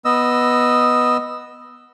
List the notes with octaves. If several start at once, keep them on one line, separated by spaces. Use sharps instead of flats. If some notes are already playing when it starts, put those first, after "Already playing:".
B3 D#5 E6